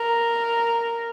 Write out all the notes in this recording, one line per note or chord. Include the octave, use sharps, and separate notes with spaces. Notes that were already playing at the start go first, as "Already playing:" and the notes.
Already playing: A#4